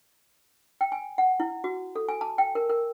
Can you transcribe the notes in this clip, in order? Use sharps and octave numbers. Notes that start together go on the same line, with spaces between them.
G5
G#5
F#5
E4
F#4
A4
G#5
A5
G5
A#4
A#4